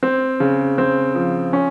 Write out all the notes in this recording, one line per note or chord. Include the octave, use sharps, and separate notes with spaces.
C4
C#3
C4
F3
C#4